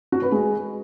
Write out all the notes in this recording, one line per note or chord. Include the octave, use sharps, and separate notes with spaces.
F#4
B4
G#3